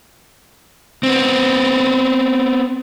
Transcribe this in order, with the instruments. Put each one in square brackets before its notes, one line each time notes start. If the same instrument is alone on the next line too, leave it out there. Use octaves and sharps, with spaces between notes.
[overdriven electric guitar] B3 C4